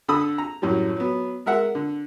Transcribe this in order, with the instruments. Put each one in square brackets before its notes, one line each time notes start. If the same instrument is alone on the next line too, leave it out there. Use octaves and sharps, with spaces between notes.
[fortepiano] D3 A4 B5 D#6 E6
A#5
F#2 A2 F#3 G3
F#3 B3
G#3 A#4 E5 F#5
D3